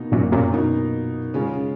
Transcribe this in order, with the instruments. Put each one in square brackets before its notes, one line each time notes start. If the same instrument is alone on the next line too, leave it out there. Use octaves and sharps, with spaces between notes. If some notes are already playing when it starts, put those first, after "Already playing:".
Already playing: [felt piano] B2 A#3 D#4
[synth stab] F#2 A#2
F#2 A#2
[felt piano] B2 A#3 D#4
C#3 G#3 C#4 F4